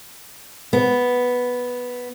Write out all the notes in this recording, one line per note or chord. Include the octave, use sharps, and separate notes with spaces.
B3